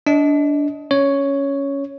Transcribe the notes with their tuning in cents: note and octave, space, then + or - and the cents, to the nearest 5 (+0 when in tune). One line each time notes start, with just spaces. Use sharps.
D4 -15 D#5 +20
C#4 +5 C#5 +5